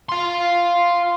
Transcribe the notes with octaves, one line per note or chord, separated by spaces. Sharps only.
F5 C6